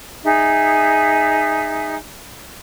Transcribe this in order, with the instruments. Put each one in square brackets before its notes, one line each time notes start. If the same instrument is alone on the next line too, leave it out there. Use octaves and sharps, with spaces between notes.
[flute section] D#4 G#4 E5